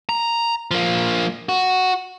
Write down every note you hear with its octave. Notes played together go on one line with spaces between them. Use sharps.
A#5
F3 A#3
F#4